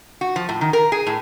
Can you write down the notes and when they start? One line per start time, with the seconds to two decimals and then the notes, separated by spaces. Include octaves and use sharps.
0.21 F#4
0.36 F3
0.49 A2
0.61 D#3
0.73 A#4
0.92 G#4
1.07 A2